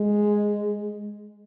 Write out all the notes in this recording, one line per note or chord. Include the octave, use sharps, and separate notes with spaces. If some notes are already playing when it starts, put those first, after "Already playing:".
Already playing: G#3